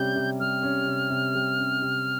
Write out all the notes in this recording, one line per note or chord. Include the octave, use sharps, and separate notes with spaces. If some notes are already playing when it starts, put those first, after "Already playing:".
Already playing: C3 G3 C#4 G6
C3
G3 F6
C#4
C3
C3
G3
C#4
C3